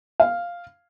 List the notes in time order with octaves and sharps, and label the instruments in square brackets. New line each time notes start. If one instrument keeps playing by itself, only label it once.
[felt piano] F5